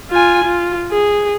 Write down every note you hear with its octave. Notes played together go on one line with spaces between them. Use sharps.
F4 G#5
F4
G#4